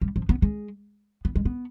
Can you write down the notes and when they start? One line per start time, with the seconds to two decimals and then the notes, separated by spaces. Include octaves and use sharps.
0.01 G3
0.16 F3
0.29 B3
0.42 G#3
1.25 B3
1.35 G#3
1.45 B3